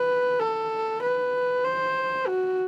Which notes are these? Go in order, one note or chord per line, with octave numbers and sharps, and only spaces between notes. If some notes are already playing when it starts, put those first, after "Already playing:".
Already playing: B4
A4
B4
C5
F#4